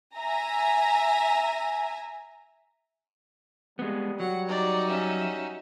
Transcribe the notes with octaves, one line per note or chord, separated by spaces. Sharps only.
E5 G#5 A#5
G3 G#3 B3
F#3 F#5
D#4 F#4 D5
C#4 E5